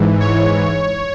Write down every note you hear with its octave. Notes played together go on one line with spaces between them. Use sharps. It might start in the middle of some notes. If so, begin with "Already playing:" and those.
Already playing: G#2 E3
C#5